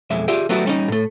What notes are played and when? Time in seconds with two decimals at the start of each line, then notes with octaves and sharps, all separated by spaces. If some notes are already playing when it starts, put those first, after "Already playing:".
0.10 B1 F2 G#3 E5
0.28 F4 G4 G#4 D5 E5 G5
0.49 F#3 G3 A3 B3 E4 F#4
0.65 G3 C#4 D#4
0.88 A2 A3